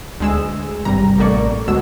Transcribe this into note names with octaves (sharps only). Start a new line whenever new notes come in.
D2 G#3 E6
G#1 G2 C3 G3 A#5
A1 A2 A3 A#3 D5 C#6
D2 B2 F#3 G#3 F#4 E6